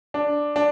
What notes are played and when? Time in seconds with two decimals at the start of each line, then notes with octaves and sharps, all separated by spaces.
0.14 D4
0.56 D4